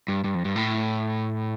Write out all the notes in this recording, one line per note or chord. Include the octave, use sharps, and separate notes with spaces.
G2
G2
F2
G2
A2